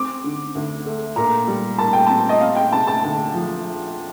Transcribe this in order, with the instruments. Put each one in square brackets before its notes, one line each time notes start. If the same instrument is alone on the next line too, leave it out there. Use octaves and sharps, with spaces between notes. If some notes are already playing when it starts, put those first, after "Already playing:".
Already playing: [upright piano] C4 D6
D3
D2
A3
A#2 A#5
G3
A#2 A5
G5
C4 A5
D#5
C4 F5
G5
C3 A5
A5
D2
F3